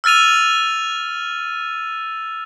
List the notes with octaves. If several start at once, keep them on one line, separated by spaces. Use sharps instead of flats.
E6 F6 A6 D#7 F7